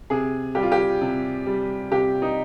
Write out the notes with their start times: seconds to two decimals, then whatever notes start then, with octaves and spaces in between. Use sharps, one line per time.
0.10 C3 G#4
0.55 G3 G4
0.63 F4
0.72 G4
1.01 C3
1.46 G3
1.91 C3 G4
2.22 D#4